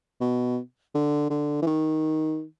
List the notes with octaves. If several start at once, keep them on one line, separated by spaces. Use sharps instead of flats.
B2
D3
D3
E3
D#3